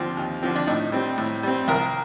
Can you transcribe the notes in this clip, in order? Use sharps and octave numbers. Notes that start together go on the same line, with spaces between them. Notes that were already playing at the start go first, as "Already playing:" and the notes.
Already playing: D#2 D3 F3 C4
D#2
D3 F3 C4
D4
A2 D#4
G3 C4
A2
G3 C4
C2 A#4